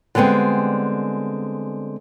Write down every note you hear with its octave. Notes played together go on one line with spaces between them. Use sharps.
D3 G3 G#3 B3 C4